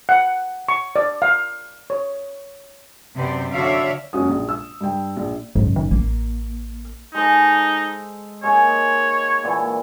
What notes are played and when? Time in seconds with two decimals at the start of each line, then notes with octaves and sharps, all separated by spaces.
0.09 F#5
0.69 C#6
0.96 D5
1.22 F5
1.90 C#5
3.15 F#2 C3 B3 C5 D5
3.52 D3 F#4 C#5 D5 E5 F5
4.13 F#2 F#3 A#3 C#4 F#4 D#6
4.29 A#1
4.49 E6
4.81 G2 G5
5.17 A#1
5.55 F#1 G#2
5.76 D#3
5.91 A1 A#3
7.14 G#3 D#4 A4 C5
8.43 G#3 A#3 D#4 C#5
9.44 A#2 D3 E3